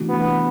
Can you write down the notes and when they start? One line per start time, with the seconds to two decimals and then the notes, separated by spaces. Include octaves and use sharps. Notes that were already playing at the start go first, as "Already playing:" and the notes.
Already playing: C3 E3 A3 D4 F#4
0.09 B3